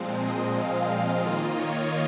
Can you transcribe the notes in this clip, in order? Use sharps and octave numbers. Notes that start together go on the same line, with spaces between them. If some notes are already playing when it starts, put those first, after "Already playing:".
Already playing: A#2 F3 G#3 C4
D#5
F5
F5
D#3 A#3 F4 D#5
C#5